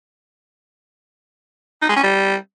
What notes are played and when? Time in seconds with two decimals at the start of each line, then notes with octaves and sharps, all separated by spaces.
1.82 D#4
1.89 G#3
1.96 C#4
2.03 G3